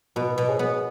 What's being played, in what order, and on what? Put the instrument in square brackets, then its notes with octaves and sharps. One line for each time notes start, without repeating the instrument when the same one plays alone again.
[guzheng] B2 [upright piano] F#4 B4
[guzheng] B2
[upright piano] G#4 C#5
[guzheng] B3